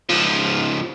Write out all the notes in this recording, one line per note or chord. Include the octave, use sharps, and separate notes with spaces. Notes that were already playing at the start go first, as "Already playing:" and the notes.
C#2 F3